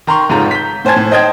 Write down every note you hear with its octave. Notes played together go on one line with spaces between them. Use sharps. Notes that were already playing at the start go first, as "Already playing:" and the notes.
D#3 A#5 C6 C#6
F1 G#2 C#3 F4 A#5
G6 B6
A2 C5 G#5 A5 G#6
A2
C5 D#5 G5 A5 D#6 G#6